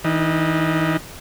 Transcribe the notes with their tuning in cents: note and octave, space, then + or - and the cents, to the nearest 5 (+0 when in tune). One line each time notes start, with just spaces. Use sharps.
E3 -40 D#4 -20